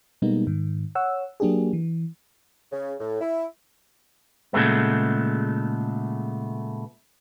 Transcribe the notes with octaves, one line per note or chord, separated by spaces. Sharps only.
B2 G3 G#3 A#3 B3 D#4
G#2 D#3
C#5 F#5 E6
F#3 A#3 D4 G4 G#4
E3
C#3
A2
E4
A#2 C#3 G#3 A3 B3